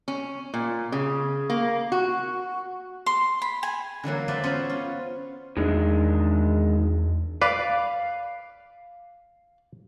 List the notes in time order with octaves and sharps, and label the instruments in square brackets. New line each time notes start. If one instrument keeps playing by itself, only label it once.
[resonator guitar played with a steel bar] C#4
A#2
C#3
A#3
F#4
[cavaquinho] C6
B5
G#5
[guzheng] D3 E3 F#3 A#3
F4 B4 C5 D5 E5
B3 C#4 F#4 C5 C#5
F4
[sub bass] E2 [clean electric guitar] D#3 G#3 D4
[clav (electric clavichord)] B4 [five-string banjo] D5 [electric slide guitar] F5